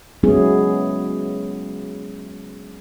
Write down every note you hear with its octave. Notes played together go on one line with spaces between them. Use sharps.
F#3 G#3 B3 C#4 E4 G#4